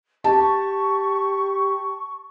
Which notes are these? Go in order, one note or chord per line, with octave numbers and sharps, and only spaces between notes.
G4 A5 C#6